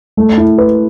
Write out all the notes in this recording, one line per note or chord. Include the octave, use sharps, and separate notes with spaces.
A3
E4
B4